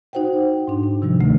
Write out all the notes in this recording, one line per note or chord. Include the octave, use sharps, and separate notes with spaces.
D#4 F#4 C5 F#5 G5
G#2 D4
D4
C3 D#3 F3 G3
D2 C3 A3